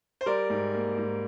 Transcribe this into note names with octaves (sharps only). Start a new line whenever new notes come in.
C5
G3 A#4 D5
G#2
A#3
G#2